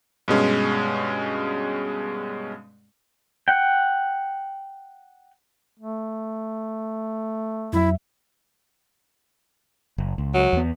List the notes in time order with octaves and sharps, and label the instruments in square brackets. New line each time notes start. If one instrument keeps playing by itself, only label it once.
[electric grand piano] G2 B2 G#3 C#4
[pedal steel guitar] F#5 G5
[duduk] A3
[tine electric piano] F2 F#3 E5 [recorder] E4
[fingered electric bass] F#1
C#2
[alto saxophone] F#3
[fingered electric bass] E2 B3